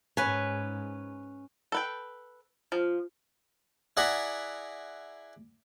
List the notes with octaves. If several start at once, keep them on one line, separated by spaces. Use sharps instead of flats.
G#2 C#4 B4 G#5
A4 B4 G5
F3 F4
E4 G#4 D5 F#5 A#5 B5